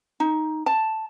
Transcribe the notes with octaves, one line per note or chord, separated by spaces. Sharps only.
D#4
A5